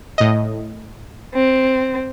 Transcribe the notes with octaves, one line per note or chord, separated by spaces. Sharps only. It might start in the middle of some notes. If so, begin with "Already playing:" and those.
A2 D#5
C4